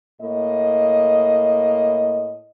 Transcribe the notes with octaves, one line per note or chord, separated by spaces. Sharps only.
A2 A#3 D#5